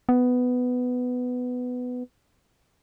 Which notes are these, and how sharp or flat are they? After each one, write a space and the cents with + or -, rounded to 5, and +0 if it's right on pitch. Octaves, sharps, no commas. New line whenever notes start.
B3 +10